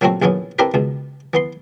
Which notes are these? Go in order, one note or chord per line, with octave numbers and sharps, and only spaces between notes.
A#2 F#3 G3 A3 C4 F#4
A#1 F#2 E3 B3 C#4
C4 D4 E4 G4 A#4 B4
C#2 B2
E3 B3 C6